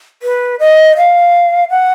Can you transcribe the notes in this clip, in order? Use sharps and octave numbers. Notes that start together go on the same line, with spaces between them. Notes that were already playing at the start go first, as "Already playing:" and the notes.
B4
D#5
F5
F#5